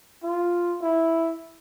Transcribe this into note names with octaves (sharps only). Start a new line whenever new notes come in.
F4
E4